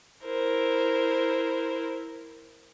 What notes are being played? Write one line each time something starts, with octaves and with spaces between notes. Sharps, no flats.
E4 A#4 C5